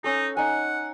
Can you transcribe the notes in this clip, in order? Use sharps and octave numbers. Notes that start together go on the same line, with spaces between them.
C#4 D#4 A4
D#4 F#5 G#5